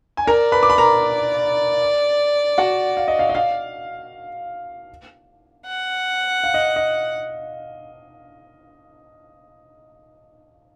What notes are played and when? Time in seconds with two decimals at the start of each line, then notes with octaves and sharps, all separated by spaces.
0.17 G#5
0.27 A#4 D5 A#5
0.52 B4 B5
0.63 D6
0.70 B5
0.78 A#4 A#5
2.58 F#4 F#5
2.97 F5
3.08 D#5
3.19 F5
3.29 D#5
3.35 F5
5.67 F#5
6.44 F5
6.54 D#5
6.76 D#5